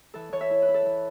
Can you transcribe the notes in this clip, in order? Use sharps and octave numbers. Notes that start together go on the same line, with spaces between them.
E3 A4
E3 C#5
E5
E4
B4
E4
A4
E3